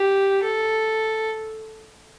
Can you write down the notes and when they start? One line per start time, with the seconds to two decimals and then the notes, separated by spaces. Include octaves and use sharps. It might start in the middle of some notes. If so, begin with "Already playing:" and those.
Already playing: G4
0.44 A4